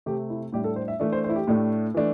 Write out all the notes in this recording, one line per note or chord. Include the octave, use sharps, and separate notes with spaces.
C3 A3 C4 G4
E4
A2 G3 D4 G4
A4
C5
E5
E3 A3 D4 E5
C5
C5
E4
G4
A2 A3 D4
E3 A3 D4